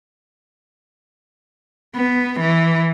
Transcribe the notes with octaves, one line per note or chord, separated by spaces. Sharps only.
B3
E3